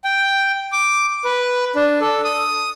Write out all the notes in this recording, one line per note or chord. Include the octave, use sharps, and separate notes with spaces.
G5
D6
B4
D4
A4
D#6